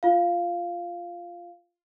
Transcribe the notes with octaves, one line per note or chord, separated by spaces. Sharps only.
F4 F5